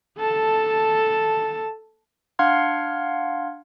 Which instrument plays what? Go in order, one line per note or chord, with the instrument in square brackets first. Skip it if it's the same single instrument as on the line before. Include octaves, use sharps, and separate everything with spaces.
[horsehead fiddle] A4 A5
[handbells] D4 F5 F#5 C6 F6 G#6